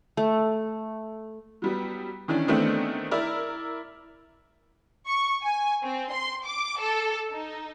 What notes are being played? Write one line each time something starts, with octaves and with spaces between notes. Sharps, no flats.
A3
F#3 G3 B3
D#3 E3 C#4 D4
D#3 E3 A3 B3 C4 D4
E4 A#4 D5
C#6
G#5
C4
C6
D6
A4
D#4